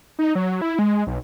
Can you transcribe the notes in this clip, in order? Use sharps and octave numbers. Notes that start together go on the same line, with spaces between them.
D#4
F#3
E4
G#3
B1